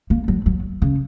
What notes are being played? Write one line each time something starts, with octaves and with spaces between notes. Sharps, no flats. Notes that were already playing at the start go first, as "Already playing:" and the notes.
A#3
F#3
F#3
C#3